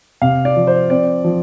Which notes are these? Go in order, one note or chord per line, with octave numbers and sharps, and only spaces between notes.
C3 F5
D5
F3
C5
C4 D5
F3